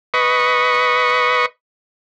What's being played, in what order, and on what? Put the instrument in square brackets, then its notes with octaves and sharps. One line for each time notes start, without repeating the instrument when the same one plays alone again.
[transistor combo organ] B4 D#5 C#6